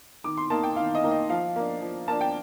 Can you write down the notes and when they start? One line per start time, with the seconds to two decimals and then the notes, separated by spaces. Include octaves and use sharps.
0.24 D#3 D6
0.37 C6
0.50 A#3 D#4 A5
0.63 G5
0.76 D#3 F5
0.95 D#5
1.04 A#3 D#4
1.11 D#5
1.29 F3 F5
1.56 A#3 D4
1.82 F3
2.08 A#3 D4 A5
2.21 G5